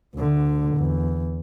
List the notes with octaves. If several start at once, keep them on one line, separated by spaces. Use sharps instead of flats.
D2 D3
E2